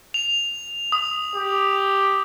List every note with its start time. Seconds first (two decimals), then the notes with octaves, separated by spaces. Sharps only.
0.14 F7
0.92 D#6
1.36 G4